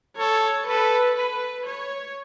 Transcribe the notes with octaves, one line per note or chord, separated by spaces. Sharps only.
A4 C#5
A4 B4
B4
C#5